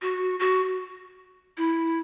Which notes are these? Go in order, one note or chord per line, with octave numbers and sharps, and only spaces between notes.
F#4
F#4
E4